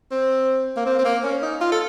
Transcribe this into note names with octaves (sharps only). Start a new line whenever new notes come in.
C4
A#3
C4
C4
A#3
C#4
D#4
F4
A4